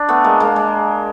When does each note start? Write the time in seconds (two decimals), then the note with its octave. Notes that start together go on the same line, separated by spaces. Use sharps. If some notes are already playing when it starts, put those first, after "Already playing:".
Already playing: D4
0.08 A3 B3
0.24 G#3 A#3
0.40 G#3 A#3
0.56 G#3